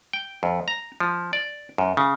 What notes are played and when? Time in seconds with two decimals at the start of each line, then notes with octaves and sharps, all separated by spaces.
0.13 G5
0.43 F2
0.68 A#5
1.00 F3
1.33 D5
1.78 F#2
1.97 C#3